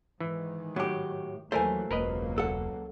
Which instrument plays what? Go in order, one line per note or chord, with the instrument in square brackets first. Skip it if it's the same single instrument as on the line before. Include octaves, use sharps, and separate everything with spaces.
[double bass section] G#2 D#3 [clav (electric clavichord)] E3
[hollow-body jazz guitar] A2 G4 [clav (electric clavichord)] F#3
[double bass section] D#2 E3 F#3 [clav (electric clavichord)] A3 A#4 [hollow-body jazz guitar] C5 G#5
[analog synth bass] E1 [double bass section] C#2 F#3 A#3 [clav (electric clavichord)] A#4 B4 D#5
[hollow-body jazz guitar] A4 F#5